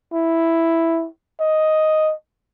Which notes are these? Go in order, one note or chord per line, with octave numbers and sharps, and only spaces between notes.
E4
D#5